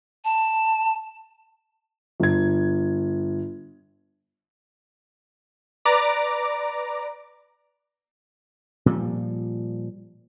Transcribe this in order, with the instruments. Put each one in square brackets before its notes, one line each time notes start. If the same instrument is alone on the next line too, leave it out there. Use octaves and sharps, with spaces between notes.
[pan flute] A5
[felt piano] G1 G#6
[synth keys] B4 D5 A#5 D6
[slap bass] A#2 F3 G3